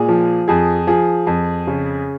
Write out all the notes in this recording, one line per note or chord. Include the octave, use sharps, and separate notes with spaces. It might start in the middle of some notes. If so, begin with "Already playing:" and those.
Already playing: A#2 G#3 G#4
F3
F2 G#4
F3 G#4
F2
C#3